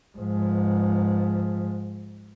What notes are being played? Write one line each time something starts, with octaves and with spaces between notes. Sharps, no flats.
G#2 F3